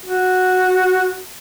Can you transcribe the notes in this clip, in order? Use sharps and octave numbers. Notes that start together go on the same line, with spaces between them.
F#4